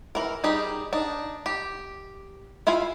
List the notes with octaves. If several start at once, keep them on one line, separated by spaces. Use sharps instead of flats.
E3 A#4
G3 D#4 G4 G#4
D4 D#4
G4
E4 F4 F5 G#5